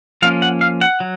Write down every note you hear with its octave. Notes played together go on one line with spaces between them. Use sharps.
F3 A#3 C#4 F5
F#5
F5
F#5
F#3